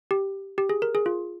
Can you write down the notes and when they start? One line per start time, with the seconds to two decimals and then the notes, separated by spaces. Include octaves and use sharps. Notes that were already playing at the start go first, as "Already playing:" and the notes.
0.11 G4
0.58 G4
0.70 G#4
0.82 A#4
0.95 G#4
1.06 F4